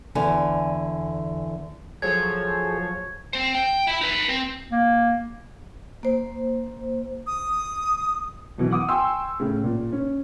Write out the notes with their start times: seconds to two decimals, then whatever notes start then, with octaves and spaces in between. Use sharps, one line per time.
0.15 E2 D3 G#5
2.02 F3 F#3 G#4 A4 C5 C#5 G#6
3.33 C4 C5
3.55 G5
3.87 E4 E5
4.01 D#4 B4
4.29 C4
4.71 A#3
6.03 A#3 C5
7.27 D#6
8.58 F#2 B2 E3
8.71 F#5 D6 D#6
8.89 G5 G#5 C6 C#6 E6
9.40 A2 C#3
9.64 A#2
9.92 C#4